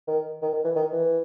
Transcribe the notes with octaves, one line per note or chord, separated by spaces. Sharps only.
D#3
D#3
D#3
E3
D#3
E3